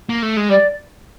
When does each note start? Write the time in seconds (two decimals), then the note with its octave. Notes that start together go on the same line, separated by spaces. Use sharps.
0.09 A#3
0.23 A3
0.37 G#3
0.50 G3 D5